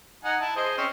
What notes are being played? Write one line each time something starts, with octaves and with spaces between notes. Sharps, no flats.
D#4 F#5 G#5
E4 A5
G#4 C5 D#5
C4 C#4 C5